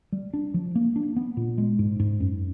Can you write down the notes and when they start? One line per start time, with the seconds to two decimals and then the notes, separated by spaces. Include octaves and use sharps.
0.12 G3
0.34 D4
0.54 F3
0.75 A#3
0.96 D4
1.16 B3
1.37 A#2
1.58 G#3
1.79 G#2
2.00 G#2
2.20 F#2